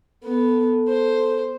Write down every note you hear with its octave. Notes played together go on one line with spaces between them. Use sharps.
B3 A4
C5